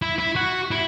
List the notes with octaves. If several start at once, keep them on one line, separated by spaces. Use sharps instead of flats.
E4
E4
F#4
E4